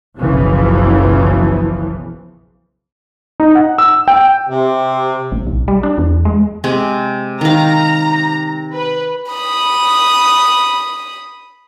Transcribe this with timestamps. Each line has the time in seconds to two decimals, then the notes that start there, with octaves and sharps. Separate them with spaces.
0.17 F#1 B1 C#3 E3 F3
3.40 D#4
3.55 F#5
3.78 E6
4.08 G5
4.49 C3
5.32 A1
5.47 B1
5.68 G3
5.83 D4
5.98 E2
6.25 G#3
6.64 C3 G#3
7.41 D#3 F5 A#5
8.75 B4
9.31 B5 D#6